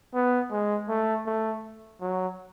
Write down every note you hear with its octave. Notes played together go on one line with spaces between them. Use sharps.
B3
G#3
A3
A3
F#3